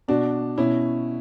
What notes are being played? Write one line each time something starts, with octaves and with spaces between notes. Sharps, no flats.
B2 D4 F#4
B2 C#4 E4